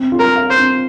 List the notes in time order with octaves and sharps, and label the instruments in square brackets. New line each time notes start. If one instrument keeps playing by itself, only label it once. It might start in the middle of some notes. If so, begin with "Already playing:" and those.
Already playing: [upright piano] C4
F4
[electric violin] A#4
[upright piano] F5
[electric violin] C5
[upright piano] C4